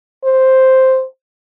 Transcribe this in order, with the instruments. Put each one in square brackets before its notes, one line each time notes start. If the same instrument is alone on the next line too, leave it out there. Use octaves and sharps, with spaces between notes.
[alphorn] C5